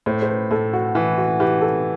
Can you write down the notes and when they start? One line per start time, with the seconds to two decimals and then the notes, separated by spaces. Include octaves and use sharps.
0.06 A2 C5
0.22 C5
0.29 B4
0.51 A2 A4
0.73 F#4
0.95 E3 E4
1.18 F#4
1.40 E3 G4
1.61 A4